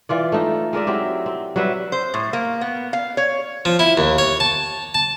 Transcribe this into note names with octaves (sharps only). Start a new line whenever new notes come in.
E3 F4 D5
A3 D#4
G#3 A#4 D5 E5
F#3 C4 E4 G4
C4
F#3 G3 B4 E5
C5
A2
A#3
B3
F5
C#5
F3
E4
D#2
C#5
A5
A5